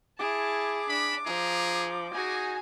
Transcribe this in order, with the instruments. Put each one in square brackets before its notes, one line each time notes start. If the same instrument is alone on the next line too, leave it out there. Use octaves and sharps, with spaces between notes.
[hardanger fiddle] E4 A5 [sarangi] G#4 [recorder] D6
[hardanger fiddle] D4 [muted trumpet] B5
[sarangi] F3 [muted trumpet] G#4 [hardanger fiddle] A#5
[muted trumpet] D#4 [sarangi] F#4 [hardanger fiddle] G#4 G#5